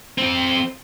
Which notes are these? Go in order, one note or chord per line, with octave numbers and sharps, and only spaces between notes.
F3 C4